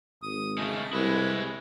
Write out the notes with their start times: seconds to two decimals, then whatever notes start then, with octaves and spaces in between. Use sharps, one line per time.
0.22 G#1 D#6
0.58 C#3 A3 D#5
0.93 C2 G#3 E4 B4